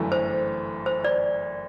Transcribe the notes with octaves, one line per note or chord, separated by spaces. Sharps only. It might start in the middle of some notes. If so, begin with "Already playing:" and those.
Already playing: G1 F#2 E3 A3
C5
C5
D5